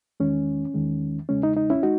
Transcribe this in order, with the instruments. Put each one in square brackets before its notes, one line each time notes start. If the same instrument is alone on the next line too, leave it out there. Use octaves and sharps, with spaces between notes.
[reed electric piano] E2 D#3 G#3 C#4
E2 D#3 G#3
E2 C#3 G#3 C#4
D#4
D#4
C#4 E4
G#3 D#4 F#4